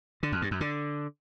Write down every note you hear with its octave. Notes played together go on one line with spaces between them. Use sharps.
D3
F2
G2
F#2
D3